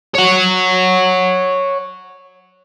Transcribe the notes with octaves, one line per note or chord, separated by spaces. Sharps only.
C#5 F#5